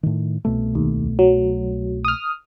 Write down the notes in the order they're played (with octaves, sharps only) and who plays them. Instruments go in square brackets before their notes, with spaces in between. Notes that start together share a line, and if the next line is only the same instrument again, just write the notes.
[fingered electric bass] A2 D#3
C2 B2 A3
[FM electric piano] D#2
F#3
D#6 F6